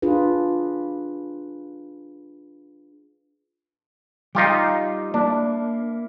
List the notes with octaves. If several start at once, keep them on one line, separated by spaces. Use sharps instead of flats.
D4 F4 G#4 B4
G3 D#4 F4 G4
A#3 D4 E4